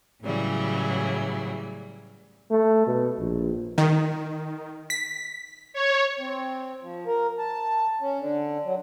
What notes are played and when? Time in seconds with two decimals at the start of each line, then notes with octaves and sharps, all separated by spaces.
0.23 A2 C#3 E3 F#3 G3
2.51 A3
2.87 B2
3.19 A#1
3.78 D#3
4.90 B6
5.73 C#5
6.20 C4
6.82 F3
7.06 A#4
7.38 A5
8.01 C#4
8.19 D3
8.65 F#3